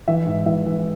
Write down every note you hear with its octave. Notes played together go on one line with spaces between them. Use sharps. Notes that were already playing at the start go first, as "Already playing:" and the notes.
E3 E5
G#2
E3 E5
E3